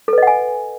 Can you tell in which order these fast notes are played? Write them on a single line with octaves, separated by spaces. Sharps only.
A4 B4 D#5 F#5 G#5